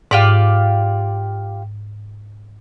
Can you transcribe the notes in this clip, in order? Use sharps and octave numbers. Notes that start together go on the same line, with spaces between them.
G#2 F4 G4 D5